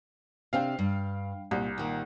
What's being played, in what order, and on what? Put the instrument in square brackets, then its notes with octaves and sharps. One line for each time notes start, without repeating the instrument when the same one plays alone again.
[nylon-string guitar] C3 C4 D4 [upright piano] F5 G5
[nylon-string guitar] G2
[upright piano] C2 [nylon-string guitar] A#2
[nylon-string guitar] A#2 D#3